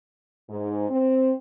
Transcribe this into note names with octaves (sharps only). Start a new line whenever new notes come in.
G#2
C4